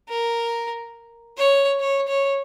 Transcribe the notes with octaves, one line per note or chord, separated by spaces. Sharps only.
A#4
C#5
C#5
C#5